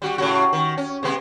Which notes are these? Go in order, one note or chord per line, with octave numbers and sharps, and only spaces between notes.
G3 F#4 G4
A2 C#3 F#4
D#3
C#4
C3 G#3 B3